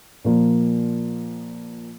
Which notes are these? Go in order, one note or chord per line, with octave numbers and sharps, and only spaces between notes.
A#2 F3 A#3